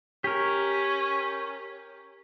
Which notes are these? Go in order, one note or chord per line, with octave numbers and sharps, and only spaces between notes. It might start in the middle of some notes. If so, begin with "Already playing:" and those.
C#4 G4 A#4